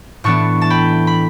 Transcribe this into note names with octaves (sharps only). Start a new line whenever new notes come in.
A2 E3 B3 D4 A5 C#6
A5
G5 B5
B5